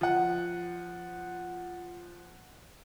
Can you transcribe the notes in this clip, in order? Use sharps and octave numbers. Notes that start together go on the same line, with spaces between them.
F3 F#5